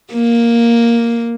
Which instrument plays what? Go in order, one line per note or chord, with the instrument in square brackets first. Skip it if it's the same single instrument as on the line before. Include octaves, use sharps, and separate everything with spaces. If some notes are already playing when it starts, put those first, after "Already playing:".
[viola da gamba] A#3